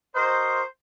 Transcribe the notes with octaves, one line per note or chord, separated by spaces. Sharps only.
F#4 A#4 C5 D#5